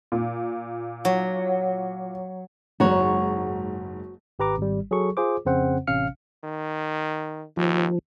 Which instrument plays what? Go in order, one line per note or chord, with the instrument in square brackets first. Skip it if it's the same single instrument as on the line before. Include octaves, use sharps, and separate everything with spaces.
[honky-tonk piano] A#2
[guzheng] F#3
[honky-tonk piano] F#1 G#2 A#5 [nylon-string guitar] F#4 C#5
[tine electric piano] G#1 G4 B4 A#5 D6
G#1 G3
F#3 G#4 A4 C#6
F4 G#4 C5 D6
F2 C#3 C4 C5 F#5
A1 C3 C#4 F5 F6 C#7
[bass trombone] D#3
[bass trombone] D#2 [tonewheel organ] F3